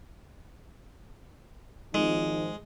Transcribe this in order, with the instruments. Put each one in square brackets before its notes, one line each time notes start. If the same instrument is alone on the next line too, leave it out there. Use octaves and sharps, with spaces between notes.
[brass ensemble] G#1 F3 D#4 [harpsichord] G#3